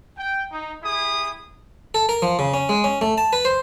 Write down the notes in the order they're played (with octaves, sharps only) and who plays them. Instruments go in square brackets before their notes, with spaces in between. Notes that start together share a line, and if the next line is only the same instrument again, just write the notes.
[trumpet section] G5
D#4
E4 G4 G#4 D#6
[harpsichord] A4
A#4
F3
C#3
C#4
G#3
C#4
A3
A5
B4
C5